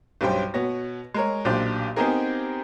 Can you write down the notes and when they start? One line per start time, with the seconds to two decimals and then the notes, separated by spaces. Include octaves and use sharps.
0.21 B1 G2 G3 C#4 C5 G5
0.54 B2 B3 C#5 A#6
1.14 G#3 A#4 C#5
1.45 B1 A#2 D4 G4 C5
1.96 B3 C4 D#4 G4 G#4 A#4